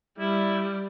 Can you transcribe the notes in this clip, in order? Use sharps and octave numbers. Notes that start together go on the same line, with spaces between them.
G3 E4